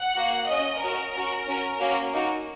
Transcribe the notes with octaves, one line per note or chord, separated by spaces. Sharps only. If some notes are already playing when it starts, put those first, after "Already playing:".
Already playing: F#5
A#3 F#4
C#4 F#4 D#5
C#4 F#4 A#4
C#4 F#4
C#4 F#4
A#3 C#4 F#4
A#3 D#4 F#4